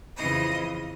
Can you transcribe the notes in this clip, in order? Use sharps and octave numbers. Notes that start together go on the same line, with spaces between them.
F2 C#3 E3 D#5